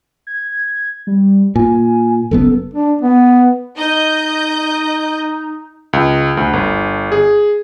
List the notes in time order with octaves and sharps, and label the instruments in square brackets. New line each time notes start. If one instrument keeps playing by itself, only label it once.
[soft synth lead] G#6
G3
[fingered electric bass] A#2 [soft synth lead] G#5
[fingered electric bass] F#1 F#2 B3 [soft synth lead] A4
[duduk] D4
B3
[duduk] D#4 [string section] D#5 G6
[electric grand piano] C#2
D2
G1
G#4